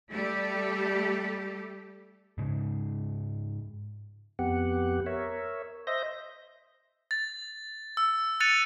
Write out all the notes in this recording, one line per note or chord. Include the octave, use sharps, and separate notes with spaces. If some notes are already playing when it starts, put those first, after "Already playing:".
G3 A3 G4 A4
G#2 C#3 G#3
F2 B3 G4 F#5
A#4 C#5 E5
C5 D#5 E5 G6 A#6
A6
E6
F#6 A6 C#7 D#7 F7